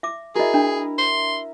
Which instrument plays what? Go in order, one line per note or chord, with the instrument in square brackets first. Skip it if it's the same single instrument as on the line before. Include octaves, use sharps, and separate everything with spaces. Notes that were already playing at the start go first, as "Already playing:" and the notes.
[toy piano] E5 D6
[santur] E4 A#4 [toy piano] F#4 D#5 [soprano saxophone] G#4
[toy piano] D4
[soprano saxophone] C6